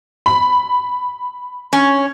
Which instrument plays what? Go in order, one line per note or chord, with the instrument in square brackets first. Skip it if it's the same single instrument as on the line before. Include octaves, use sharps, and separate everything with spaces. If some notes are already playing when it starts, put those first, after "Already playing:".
[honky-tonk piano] B5
[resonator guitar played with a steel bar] C#4